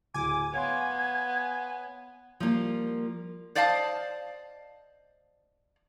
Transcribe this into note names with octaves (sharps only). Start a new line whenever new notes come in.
D1 G#5 D6
B3 C#5 F5 C6 G#6
F3 G3 A#3 F4
C5 D5 D#5 F5 A5